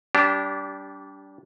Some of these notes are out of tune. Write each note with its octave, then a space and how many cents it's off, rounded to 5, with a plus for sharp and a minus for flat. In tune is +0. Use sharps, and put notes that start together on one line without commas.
G3 -25 D4 -25 G4 +0